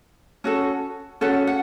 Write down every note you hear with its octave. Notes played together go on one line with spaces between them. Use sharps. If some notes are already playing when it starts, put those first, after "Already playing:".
C#4 F#4 A4
C#4 F#4 A4 F#5
F#5